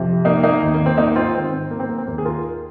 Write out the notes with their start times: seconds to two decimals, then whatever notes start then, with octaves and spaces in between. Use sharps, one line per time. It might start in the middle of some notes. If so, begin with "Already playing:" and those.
Already playing: F2 C3 F3
0.25 A#3 D#4
0.43 A#3 D#4
0.62 D#2 D#3
0.74 A#3
0.86 C4
0.98 A#3 D#4
1.16 C4 F4
1.34 G#2 D#3 C4
1.52 C4
1.70 A#3
1.80 C4
1.89 A#3
1.98 C4
2.07 D#2 D#3 A#3
2.18 G#4
2.25 F4 A#4